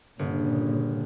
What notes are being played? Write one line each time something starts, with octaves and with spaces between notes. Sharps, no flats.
G1 A#2 C#3